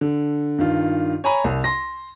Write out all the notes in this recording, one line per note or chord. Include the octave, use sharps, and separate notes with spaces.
D3
G2 D#3 F4
C#5 G#5 A#5 B5
C2
C6 A#6